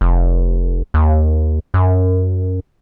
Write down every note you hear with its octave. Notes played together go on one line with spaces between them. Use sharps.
F1
D#2
F#2